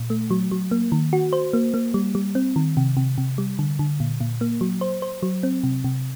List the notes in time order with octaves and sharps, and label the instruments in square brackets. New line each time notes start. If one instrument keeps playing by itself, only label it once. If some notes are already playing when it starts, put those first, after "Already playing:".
Already playing: [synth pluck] A#2
A3
F#3
F#3
A#3
D#3
F#4
C5
A#3
A#3
G3
G3
C4
D#3
C3
C3
C3
G3
D3
D3
A#2
A#2
A#3
F#3
C5
C5
F#3
C4
C3
C3